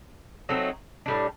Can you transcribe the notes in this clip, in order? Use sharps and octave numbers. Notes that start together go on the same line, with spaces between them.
F#3 A3 C4 D#4
A2 G3 D4